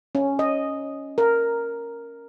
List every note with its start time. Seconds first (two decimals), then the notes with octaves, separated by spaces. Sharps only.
0.15 C#4
0.39 D#5
1.18 A#4